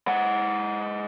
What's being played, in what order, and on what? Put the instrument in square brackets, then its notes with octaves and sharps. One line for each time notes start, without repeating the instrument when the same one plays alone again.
[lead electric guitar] G#3 F#5